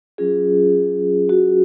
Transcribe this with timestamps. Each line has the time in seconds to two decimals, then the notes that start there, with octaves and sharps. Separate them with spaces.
0.18 F#3 C#4 F4 G#4
1.29 F#4